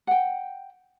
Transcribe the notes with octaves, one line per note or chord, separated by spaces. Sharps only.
F#5 G5